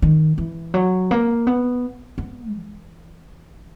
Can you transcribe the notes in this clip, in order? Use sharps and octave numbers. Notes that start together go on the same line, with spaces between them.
D#3
E3
F#3
A#3
B3
B3
E3